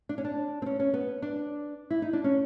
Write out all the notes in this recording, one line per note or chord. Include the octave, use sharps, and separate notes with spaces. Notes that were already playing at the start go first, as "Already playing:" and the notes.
D4
C#4
D4
C4
C#4
C#4
B3
D4
E4
D#4
D4
C#4